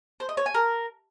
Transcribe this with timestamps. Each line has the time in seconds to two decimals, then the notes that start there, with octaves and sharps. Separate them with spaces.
0.20 C5
0.29 D#5
0.37 C#5
0.46 G#5
0.54 A#4